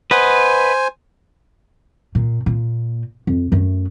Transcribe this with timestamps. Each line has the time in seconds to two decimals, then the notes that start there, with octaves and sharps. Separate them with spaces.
0.11 B4 C5 D#5 F#5 G#5
2.15 A#2
2.46 A#2
3.27 F2
3.52 F#2 A3